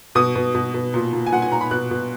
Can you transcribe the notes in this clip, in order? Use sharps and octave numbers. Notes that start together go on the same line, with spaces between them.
B2 D#6
B2
B2
B2
A#2
A#2
G#5
A#2 F#5
G#5
A#2 A#5
B5
B2 F#6
B2